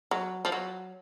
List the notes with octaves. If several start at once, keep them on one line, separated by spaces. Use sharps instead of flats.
F#3
F3
F#3